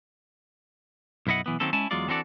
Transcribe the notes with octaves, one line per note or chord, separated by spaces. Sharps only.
B1 F#2 E4 D#5 F#5
B1 E3 B3
D#3 F#3 A#3 C4 C#4 A4
G#3 C#4 E4 G#5 A5
E2 F#3 G#3 F4 D5
E3 C4 D4 F#4 A4 D5